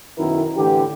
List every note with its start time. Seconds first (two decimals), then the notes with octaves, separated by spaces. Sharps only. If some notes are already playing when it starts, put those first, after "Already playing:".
0.18 B1 F#2 D#3 B3 E4 A#4
0.56 A2 D3 E3 G4